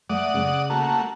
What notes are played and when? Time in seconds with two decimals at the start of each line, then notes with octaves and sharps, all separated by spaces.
0.10 A3 D5 F#5 D#6
0.34 C#3 C#4
0.70 A3 A#3 F#4